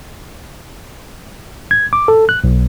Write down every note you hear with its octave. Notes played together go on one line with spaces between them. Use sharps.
G#6
D6
A4
F#6
B1